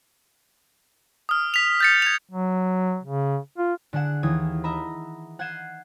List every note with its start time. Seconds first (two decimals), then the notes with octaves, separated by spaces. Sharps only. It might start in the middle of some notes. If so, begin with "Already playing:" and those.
1.29 D#6 F6
1.54 B6 F7
1.81 G6 A6 C#7
2.02 G#6 F7
2.32 F#3
3.04 C#3
3.58 F4
3.93 D3 D4 G#4 F#5 E7
4.23 D#2 E3 D#6 G#6
4.64 D#5 E5 A#5 B5
5.39 F#5 G6 G#6 C7 D#7 E7